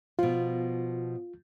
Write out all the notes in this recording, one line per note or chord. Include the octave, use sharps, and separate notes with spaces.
B2 F3 F4